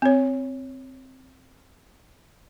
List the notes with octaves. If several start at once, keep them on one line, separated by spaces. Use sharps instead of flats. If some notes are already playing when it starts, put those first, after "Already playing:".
C4 C#5